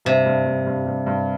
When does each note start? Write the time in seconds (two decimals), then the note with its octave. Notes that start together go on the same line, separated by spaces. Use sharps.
0.05 G2 C3
0.26 G2
0.46 G2
0.66 G2
0.86 G2
1.07 G2